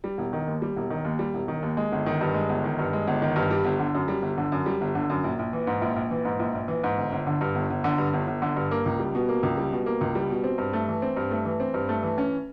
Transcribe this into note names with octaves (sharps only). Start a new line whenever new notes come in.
G3
E1
D#3
D#2
G3
E1
D#3
D#2
G3
E1
D#3
D#2
G#3
G1
D#3
G2
G#3
G1
D#3
G2
G#3
G1
D#3
G2
G3
G1
D3
F#2
G3
G1
D3
F#2
G3
G1
D3
F#2
A#1
A#1
E3
G#2
A#1
A#1
E3
G#2
A#1
A#1
E3
G#2
G1
G1
D3
G2
G1
G1
D3
G2
G1
G1
D3
G2
A#3
C#2
G3
B2
A#3
C#2
G3
B2
A#3
C#2
G3
B2
C4
G2
A3
E3
C4
G2
A3
E3
C4
G2
A3
E3
C#4